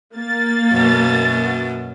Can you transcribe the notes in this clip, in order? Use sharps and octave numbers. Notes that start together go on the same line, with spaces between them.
A#3 A6
F#2 B2